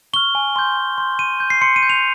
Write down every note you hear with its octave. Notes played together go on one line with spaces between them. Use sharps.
C#6 F6 G7
G#5
C6 G6
G#5
C6 G6
C6 D#7
G6
C7
C6 C#7
D#7
G6
F7